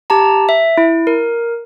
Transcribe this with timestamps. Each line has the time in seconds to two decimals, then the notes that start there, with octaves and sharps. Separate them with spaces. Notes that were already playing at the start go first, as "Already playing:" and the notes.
0.10 G4 A5 A#5
0.49 E5
0.78 E4
1.07 A#4